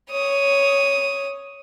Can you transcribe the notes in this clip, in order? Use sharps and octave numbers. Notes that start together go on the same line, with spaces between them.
C#5 D#6